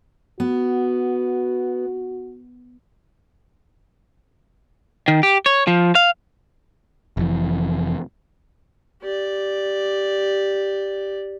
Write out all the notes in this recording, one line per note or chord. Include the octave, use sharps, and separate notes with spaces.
B3 F#4
D#3
G4
C#5
F3
F5
F1 F2 E3
G4 D5